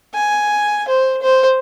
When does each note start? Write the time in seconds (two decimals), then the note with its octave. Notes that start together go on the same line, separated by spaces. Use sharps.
0.15 G#5
0.88 C5
1.22 C5